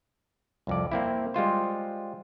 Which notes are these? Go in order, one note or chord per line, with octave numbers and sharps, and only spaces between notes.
C2 F2 D5
A#3 C4 E4
G3 G#3 F4 C5